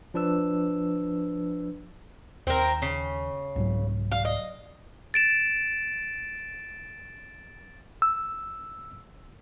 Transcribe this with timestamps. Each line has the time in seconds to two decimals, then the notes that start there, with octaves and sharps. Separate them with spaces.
0.14 F3 D4 B4 E6
2.47 D#2 C4 A#4
2.82 C#3
3.56 C2 G#2 F#3
4.12 F5
4.25 D#5
5.14 A6 D7 E7
8.02 E6